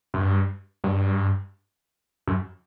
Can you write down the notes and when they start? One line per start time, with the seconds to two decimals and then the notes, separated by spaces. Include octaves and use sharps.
0.14 F#2
0.20 G2
0.84 G2
2.27 F#2